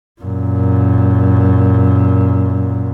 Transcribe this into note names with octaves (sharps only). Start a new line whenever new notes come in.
F#2 A#2